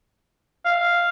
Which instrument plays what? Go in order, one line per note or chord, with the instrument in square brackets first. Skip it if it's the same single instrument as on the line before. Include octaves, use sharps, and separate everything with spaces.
[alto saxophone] F5